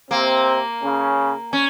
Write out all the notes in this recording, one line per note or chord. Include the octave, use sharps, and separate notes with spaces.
C3 A#3 C4
C#3 C#4
C#4